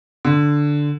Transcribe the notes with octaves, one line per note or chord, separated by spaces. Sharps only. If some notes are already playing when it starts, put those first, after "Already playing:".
D3